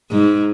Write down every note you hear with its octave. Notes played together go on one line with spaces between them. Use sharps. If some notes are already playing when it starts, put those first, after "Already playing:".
G#2